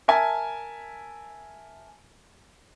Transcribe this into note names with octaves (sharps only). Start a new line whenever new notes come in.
A#4 E5 G#5 A5